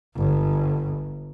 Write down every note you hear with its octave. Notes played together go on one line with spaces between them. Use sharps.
G1